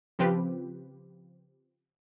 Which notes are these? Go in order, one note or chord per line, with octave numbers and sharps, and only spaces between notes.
C#3 F3 C4 F4 G4 B4